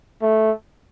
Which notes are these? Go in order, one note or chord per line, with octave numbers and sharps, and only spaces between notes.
A3